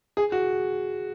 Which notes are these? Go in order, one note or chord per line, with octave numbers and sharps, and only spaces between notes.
G#4
F#4